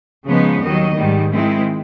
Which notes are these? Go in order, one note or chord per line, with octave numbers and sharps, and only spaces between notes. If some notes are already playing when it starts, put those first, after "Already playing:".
C#3 F3 G#3 B3 D#4
D#2 D#3 F#3 D#5
G#2 D#3 G3
D#3 G#3 C4 E4